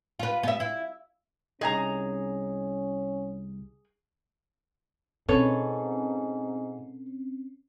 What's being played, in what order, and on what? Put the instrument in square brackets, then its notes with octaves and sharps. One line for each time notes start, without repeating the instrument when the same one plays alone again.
[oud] F4 B4
B3 E5
E4
[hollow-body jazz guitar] C2 D#4 [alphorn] C#4 [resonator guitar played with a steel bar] G#4 G#5 A#5
[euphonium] G#2 [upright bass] B2 [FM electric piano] C4 C#4 [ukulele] A4 B4 C#5